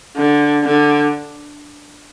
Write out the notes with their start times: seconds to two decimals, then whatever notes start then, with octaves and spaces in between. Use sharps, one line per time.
0.17 D3
0.64 D3